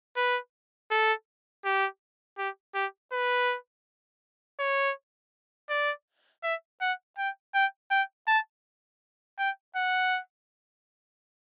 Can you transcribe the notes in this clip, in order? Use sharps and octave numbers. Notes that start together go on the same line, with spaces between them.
B4
A4
G4
G4
G4
B4
C#5
D5
E5
F#5
G5
G5
G5
A5
G5
F#5